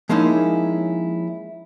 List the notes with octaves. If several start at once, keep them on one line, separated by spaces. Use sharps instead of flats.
F3 G#3 A#3 C#4 D#4 E4